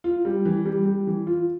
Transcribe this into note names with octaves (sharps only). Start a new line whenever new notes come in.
F4
G3
E3
G3
G3
E3
F4